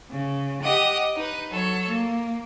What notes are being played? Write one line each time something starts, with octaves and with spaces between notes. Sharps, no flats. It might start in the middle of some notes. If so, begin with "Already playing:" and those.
C#3
G4 D#5 F#5 D#6
D#4 B4
F#3 A4 C#5
A#3